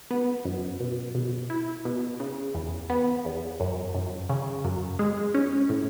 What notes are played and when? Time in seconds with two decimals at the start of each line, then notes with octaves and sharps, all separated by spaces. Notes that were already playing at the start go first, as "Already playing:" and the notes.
0.11 B3
0.45 F#2
0.80 B2
1.15 B2
1.50 E4
1.85 B2
2.20 C#3
2.55 E2
2.90 B3
3.25 E2
3.60 F#2
3.95 F#2
4.29 C#3
4.65 F#2
4.99 G#3
5.34 C#4
5.69 A2